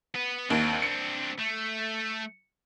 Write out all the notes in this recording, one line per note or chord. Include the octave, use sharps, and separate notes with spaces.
B3 B4
D#2 C4 D4
C#7
A3